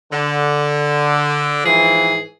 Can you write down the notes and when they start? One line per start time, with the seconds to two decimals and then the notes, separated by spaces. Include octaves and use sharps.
0.12 D3
1.65 G#2 E3 F3 G#4